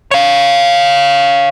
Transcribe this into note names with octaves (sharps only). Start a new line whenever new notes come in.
C#5 F5